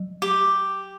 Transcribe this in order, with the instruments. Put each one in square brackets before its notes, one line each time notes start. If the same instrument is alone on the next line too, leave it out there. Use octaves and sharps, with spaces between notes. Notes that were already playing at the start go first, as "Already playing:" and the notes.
Already playing: [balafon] F#3
[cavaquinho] G4